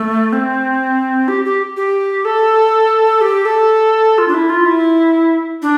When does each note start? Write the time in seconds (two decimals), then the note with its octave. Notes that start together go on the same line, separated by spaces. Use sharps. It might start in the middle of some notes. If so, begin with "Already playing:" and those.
Already playing: A3
0.33 C4
1.28 G4
1.45 G4
1.77 G4
2.25 A4
3.21 G4
3.45 A4
4.18 F4
4.28 D4
4.34 E4
4.49 F4
4.66 E4
5.62 D4